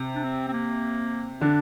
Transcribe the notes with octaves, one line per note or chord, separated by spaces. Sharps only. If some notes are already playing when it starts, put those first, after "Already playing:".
Already playing: C3
D4
C4
C4
A#3
D3 D4